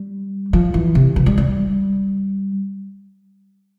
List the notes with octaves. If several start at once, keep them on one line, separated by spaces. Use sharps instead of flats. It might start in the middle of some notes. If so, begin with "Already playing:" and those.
Already playing: G3
F3
E3
C3
E3
G3
G3